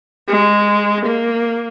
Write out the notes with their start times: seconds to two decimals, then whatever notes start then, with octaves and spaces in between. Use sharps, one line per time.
0.28 G#3
1.06 A#3